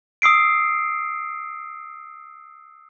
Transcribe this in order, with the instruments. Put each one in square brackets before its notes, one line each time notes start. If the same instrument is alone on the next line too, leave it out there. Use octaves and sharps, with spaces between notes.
[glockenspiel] D#6 E6 C7 D7